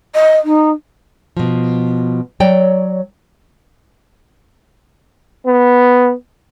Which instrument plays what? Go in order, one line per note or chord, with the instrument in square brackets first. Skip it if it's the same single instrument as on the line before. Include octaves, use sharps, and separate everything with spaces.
[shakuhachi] D#5
D#4
[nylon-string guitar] B2 F3
F#3 C#5 D5 G5
[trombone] B3